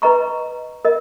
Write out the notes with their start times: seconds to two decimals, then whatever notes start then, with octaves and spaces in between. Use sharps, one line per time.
0.02 B4 D#5 A#5 C#6
0.85 A#4 D#5